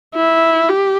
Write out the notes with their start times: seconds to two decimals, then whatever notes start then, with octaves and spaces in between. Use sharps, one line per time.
0.15 E4
0.69 G4